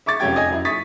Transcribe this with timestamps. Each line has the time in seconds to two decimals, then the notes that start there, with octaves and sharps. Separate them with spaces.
0.06 E5 C#6 D6 A6
0.20 F1 F#2 C#4 G4 G5 G#6
0.36 D#5 G#5 G#6
0.50 F#2 E4
0.65 C#6 D#6 A6 B6